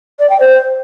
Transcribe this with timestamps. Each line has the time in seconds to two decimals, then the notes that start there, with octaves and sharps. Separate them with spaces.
0.19 D5
0.29 G5
0.39 C5